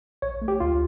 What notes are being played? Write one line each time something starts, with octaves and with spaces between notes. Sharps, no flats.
A#1 C#5
A3
G4
D2 F4